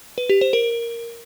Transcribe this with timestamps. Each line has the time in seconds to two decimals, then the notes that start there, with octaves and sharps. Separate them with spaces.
0.18 B4
0.29 G4
0.41 C5
0.53 A#4